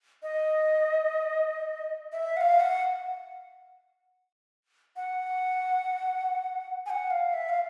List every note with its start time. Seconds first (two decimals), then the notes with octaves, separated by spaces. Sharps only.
0.23 D#5
2.12 E5
2.37 F#5
2.40 F5
2.60 F#5
4.96 F#5
6.86 G#5
6.90 F#5
7.10 F5
7.33 E5
7.49 F5